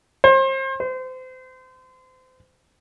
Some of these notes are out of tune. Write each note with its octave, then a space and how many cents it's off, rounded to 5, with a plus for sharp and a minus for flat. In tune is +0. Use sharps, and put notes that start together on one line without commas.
C5 +35
C5 -30